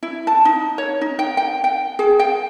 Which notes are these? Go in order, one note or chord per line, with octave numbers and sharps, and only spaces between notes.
E4
A5
D#4
C#5
D#4
G5
G5
G5
G#4
G5